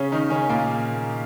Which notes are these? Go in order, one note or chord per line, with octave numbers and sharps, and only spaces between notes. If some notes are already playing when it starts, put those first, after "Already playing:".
Already playing: C#3 C#4
D#3 D#4
C#3 C#4
A#2 A#3